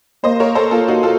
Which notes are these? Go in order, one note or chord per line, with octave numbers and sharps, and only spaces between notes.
A#3 C5 D#5
A#4 C#5
A4 C5
A#3 F4 A4
D#4 F#4
F4 A4